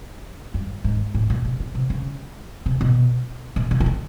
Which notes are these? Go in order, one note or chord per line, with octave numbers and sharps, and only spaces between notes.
G2
G#2
A2
A#2
B2
B2
C3
C#3
C3
B2
A#2
B2
D#3
D3